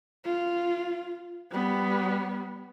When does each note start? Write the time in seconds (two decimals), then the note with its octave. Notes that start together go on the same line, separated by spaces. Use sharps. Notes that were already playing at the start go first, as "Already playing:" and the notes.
0.25 F4
1.51 G3 B3